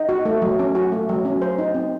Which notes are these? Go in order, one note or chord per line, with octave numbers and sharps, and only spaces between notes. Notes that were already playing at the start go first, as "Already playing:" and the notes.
Already playing: D#4
F#4
A3
F#3
C#4
F#4
A3
F#3
C#4
C5
D#4
C4